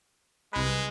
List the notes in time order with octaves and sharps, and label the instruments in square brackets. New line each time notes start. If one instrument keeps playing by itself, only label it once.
[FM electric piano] C2 B4 [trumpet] G#3